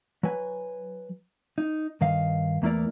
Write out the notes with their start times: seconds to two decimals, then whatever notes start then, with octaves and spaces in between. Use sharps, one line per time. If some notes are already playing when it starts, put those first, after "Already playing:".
0.23 F#3 B4 G#5
1.58 D#4
2.01 G2 D#3 D#5 F5
2.62 E2 A3 A#3 E4 A#4 D5